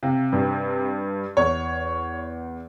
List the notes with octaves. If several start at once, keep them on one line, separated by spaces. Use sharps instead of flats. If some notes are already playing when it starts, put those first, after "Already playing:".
C3 F5
G2
E2 C#5